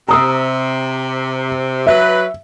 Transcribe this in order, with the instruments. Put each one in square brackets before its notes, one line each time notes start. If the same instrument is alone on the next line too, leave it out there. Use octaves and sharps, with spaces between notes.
[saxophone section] C3 [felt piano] A#5 D#6 E6
[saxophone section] F#3 B4 [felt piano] E5